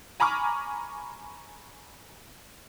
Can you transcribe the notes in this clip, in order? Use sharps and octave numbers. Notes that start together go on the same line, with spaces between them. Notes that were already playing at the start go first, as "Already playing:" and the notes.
G#5 A#5 B5 C#6 D6 F6